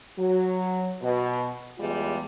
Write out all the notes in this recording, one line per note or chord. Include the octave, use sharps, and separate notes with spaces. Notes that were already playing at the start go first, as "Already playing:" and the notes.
F#3
B2
E2 G3 G#3 F4